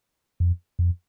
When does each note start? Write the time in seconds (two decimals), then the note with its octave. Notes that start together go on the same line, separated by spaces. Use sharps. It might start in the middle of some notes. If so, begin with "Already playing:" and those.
0.40 F2
0.79 F2